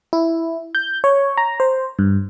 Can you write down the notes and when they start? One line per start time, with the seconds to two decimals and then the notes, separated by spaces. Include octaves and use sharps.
0.13 E4
0.75 G6
1.04 C#5
1.37 A#5
1.60 C5
1.99 G2